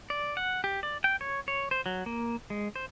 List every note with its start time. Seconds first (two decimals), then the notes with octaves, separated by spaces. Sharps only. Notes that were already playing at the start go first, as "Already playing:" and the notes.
0.10 D5
0.37 F#5
0.64 G4
0.83 D5
1.04 G5
1.21 C#5
1.48 C#5
1.71 C5
1.86 F#3
2.06 A#3
2.50 G#3
2.76 C5